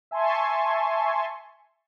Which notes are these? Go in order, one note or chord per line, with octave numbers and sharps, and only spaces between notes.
E5 G#5 A5 C6 C#6